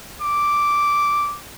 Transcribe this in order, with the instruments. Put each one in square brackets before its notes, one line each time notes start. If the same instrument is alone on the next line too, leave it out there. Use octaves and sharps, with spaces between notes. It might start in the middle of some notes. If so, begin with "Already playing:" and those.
[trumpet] D6